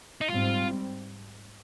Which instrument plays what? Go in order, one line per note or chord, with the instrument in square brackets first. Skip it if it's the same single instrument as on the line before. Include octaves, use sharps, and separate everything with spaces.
[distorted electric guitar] D#4
[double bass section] G#2 G3 C4 [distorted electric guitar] F4